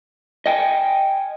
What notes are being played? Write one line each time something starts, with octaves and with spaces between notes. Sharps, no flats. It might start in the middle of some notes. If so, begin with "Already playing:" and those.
D#5 G5 G#5